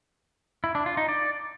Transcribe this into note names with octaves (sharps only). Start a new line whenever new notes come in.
E4
D4
F4
D#4
D5